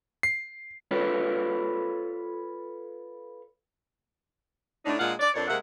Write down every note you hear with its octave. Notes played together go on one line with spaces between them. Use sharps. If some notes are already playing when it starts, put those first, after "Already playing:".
C7
F4 A4 B4 C#5
A2 D4 D#4
A#2 G#3 D4 F4 F5 F#5
D5
F2 C4 D4 A#4 C#5 D5
C3 G#3 A#3 E5 F#5